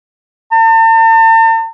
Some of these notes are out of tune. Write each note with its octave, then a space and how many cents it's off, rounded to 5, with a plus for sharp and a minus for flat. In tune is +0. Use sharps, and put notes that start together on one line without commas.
A5 +45